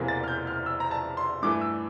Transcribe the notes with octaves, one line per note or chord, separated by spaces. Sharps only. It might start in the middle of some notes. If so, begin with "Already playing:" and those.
Already playing: E1 E2 C3 E3 A#3
A6
F6
G6
F6
E6
A#5
A5
C6
G2 E3 A3 D6
E6